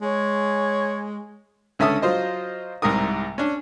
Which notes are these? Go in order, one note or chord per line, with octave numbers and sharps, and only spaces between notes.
G#3 C#5
C#2 D3 C#4 E5 A5 D#6
F#3 F4 C5 D#5
C2 G#2 C3 A#4 D#6
C#4 D4